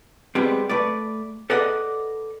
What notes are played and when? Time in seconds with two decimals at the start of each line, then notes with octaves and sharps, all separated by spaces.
0.35 G3 G#3 B3 C4
0.69 A3 B4 D5
1.50 A4 B4 D5 D#5 F#5